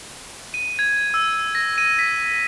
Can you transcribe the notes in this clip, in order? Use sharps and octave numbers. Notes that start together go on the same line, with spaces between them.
D#7
G#6
E6
A#6
D#7
B6